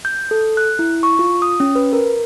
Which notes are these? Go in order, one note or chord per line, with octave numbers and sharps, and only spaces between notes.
G6
A4
F#6
E4
C#6
F4
D#6
C#4
B4
A#4